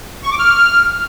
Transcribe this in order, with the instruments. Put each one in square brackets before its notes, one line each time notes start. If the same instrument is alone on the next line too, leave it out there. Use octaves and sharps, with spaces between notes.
[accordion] C#6
D6
F6